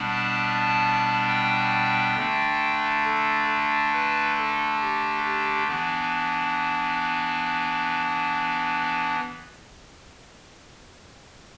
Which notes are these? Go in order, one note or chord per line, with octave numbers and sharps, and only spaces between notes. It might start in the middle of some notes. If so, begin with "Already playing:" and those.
Already playing: B2 G3 B3 D4
A5
G5
D3 A3 D4
A4
B4
A4
G4
G4
E3 B3 D4